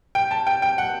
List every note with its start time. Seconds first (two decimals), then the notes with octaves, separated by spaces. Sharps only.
0.15 G5
0.31 A5
0.47 G5
0.62 G5
0.78 F#5